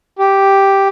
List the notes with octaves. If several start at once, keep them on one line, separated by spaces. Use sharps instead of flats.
G4